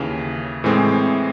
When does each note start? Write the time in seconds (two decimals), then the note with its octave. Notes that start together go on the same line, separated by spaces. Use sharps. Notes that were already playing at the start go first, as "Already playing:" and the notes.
Already playing: D#2 C#3 E3
0.64 A2 E3 G#3 C4